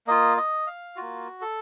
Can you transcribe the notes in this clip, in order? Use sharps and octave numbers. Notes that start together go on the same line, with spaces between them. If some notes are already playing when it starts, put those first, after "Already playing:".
A#3 F4 D#5
D#5
F5
A#3 F4 F#4
A4